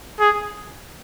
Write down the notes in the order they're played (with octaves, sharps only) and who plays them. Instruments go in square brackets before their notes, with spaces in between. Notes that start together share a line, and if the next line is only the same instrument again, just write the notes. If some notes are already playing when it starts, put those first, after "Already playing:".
[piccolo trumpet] G#4